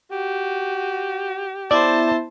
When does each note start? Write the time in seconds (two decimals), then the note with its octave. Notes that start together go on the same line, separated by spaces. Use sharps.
0.11 F#4 G4
1.71 B3 E4 C5 D5 E5 A5